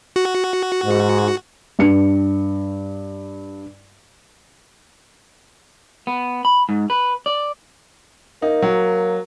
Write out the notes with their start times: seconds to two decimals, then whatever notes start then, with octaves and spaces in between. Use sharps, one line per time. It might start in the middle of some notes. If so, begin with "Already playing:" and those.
0.16 F#4
0.85 G#2
1.79 G2 C#7
6.07 B3
6.45 B5
6.69 G#2
6.90 B4
7.26 D5
8.42 A#3 D#4
8.62 F#3